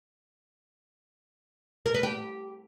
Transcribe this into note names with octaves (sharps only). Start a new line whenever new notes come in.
A#4
B4
G4